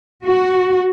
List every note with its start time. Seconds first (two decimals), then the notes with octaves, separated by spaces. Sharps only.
0.25 F#4